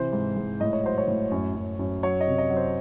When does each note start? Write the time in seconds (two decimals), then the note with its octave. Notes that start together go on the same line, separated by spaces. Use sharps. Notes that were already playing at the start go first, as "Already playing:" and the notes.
Already playing: C3 E3 C5
0.13 G#2
0.37 G#2
0.60 A2 D#5
0.73 C#5
0.84 F#3 C5
0.98 C#5
1.08 A2
1.31 F#2
1.55 F#2
1.79 F#2
2.03 F#3 C#5
2.21 D#5
2.27 C3
2.38 D#5
2.50 F#3
2.57 C5